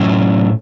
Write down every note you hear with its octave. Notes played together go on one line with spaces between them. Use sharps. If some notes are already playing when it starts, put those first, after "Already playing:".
Already playing: A2 F#3 A3 C#4 E4